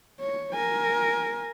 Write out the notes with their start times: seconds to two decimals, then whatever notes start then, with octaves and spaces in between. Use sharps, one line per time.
0.21 C#5
0.53 A#4 G#5